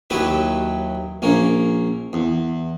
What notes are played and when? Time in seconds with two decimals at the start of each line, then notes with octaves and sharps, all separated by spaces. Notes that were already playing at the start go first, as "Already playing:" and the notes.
0.10 D#2 F#3 E4 G4 B4
1.22 A#1 A#3 C#4
2.13 E2